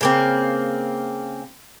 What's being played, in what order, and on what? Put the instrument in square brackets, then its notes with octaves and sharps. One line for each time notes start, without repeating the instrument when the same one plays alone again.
[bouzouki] C#3 A#3 C4